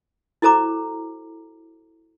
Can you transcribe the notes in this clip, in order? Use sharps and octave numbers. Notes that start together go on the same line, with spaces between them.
E4 F#4 A4 C5 A#5 D6